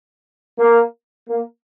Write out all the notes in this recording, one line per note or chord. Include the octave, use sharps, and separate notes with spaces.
A#3
A#3